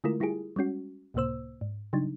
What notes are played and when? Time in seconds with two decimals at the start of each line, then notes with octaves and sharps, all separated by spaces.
0.04 D3 G#3 A3 E4 F4 A#4
0.20 G3 E4 F4 G4 G#4
0.56 G3 G#3 C#4 F#4
1.14 C#2 A2 C3 A#3 C5 E6
1.61 G#2
1.93 C#3 F#3 G3 D4 D#4